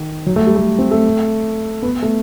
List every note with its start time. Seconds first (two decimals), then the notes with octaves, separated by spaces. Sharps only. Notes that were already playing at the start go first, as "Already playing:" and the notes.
Already playing: D#3
0.27 F#3
0.36 A3
0.46 G3
0.56 A3
0.79 C4
0.91 A3
1.82 B3
2.02 A3